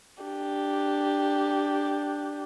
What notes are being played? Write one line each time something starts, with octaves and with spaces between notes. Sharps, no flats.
D4 G4